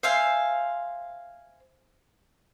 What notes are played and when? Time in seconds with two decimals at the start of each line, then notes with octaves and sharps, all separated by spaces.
0.03 C5 E5 F5 G#5